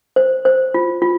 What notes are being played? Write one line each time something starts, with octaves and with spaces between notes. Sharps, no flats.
C5
C5
F4
F4